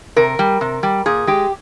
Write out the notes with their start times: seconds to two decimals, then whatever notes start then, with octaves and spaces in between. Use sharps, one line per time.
0.16 C3 A#4
0.39 G3
0.61 C3
0.83 G3
1.06 A#2 G#4
1.27 G#3 G4